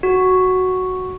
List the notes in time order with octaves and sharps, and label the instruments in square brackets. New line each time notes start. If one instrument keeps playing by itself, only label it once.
[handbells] F#4